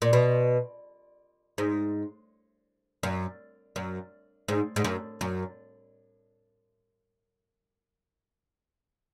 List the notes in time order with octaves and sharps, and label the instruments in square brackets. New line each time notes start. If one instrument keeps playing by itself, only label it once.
[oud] A#2
B2
G#2
F#2
F#2
G#2
G#2
F#2
F#2